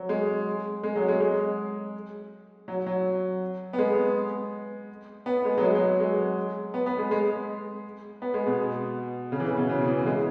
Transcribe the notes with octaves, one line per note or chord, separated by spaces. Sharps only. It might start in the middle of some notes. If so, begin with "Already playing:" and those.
Already playing: F#3
G#3
G#3
F#3
G#3
G#3
F#3
F#3
B3
G#3
B3
G#3
F#3
G#3
F#3
G#3
B3
B3
G#3
G#3
B3
G#3
B2
C#3
E3
C#3
B2
C#3
E3
G#3